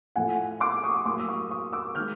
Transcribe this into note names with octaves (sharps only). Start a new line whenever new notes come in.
A2 F3 A3 F#5 G#5
C6 D6
C#6 D#6
A2 F#3 A#3 C6 D6
E6
C#6 D#6
C#6 D#6
D6 E6
D#3 G#3 F6 G6